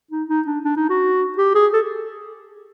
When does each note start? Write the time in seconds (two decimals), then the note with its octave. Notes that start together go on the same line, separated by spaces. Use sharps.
0.11 D#4
0.29 D#4
0.47 D4
0.65 D4
0.77 D#4
0.90 F#4
1.38 G4
1.55 G#4
1.74 A4